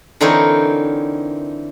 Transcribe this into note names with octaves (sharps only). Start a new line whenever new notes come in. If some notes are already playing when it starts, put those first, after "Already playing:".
D3 E3 C4 D#4 A#4 C#5